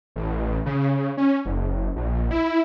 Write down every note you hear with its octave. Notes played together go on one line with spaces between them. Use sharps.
A1
C#3
C#4
F#1
A#1
E4